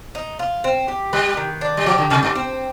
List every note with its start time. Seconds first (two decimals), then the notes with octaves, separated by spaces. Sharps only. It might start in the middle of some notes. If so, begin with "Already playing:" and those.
0.15 D#4
0.39 F4
0.64 C4
0.88 G4
1.13 G3 B4
1.37 D#3
1.61 D4
1.77 G3
1.86 F3 G4
1.98 D3
2.10 C3 G3
2.23 G2
2.35 C4